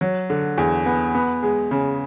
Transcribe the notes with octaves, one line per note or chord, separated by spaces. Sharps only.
F#3
D3
E2
B3
B3
G#3
C#3